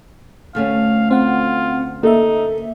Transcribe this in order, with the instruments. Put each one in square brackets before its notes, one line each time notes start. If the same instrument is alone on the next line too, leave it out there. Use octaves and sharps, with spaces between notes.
[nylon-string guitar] D2 A3 C#4 [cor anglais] F5
[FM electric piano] C4 F#5 [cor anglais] F4
[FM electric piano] A#3 E5 [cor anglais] D#4 [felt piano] A4